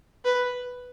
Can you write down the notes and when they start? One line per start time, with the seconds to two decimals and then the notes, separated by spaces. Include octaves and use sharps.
0.25 B4